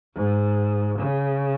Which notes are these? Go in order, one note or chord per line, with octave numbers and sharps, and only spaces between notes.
G#2
C#3